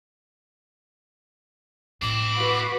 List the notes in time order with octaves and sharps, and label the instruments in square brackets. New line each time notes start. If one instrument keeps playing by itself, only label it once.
[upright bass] A2 [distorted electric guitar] C4 E4 [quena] D6
[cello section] F#4 B4